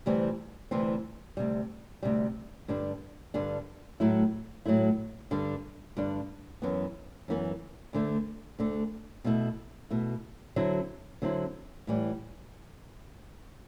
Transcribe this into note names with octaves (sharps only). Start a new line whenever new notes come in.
D2 C3 E3 G3 C4
D2 C3 E3 G3 C4
D2 C3 G3
D2 C3 G3
G2 D3 G3 D4
G2 D3 G3 D4
A2 F#3 A3 E4
A2 F#3 A3 E4
G2 D3 G3 D4
G2 D3 G3 D4
F#2 E3 B3
F#2 E3 B3
D2 D3 A3
D2 D3 A3
B2 A3 E4
B2 A3 E4
D3 F#3 C4 E4
D3 F#3 C4 E4
A2 E3 G3